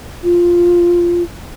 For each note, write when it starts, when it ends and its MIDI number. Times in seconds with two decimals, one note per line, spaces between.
0.24 1.23 65